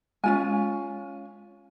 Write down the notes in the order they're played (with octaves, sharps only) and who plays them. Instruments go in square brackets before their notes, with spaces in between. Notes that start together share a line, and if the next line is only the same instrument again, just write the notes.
[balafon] G#3 [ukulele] C#4 F4 G#5